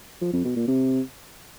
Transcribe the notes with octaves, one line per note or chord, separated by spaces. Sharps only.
F3
F2
B2
A#2
C3